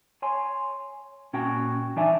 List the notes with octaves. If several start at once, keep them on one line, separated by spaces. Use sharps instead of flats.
C#5 G#5 C6
A#2 C#4 F#4 G5
E3 D4 D#4 D5 E5 G#5